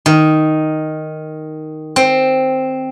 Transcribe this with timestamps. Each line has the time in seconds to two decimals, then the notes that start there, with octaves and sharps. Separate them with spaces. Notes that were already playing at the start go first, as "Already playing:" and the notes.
0.06 D#3
1.96 C4